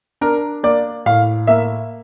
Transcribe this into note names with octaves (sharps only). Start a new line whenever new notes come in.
D4 A#4
A#3 D5
A2 F5
A#3 E5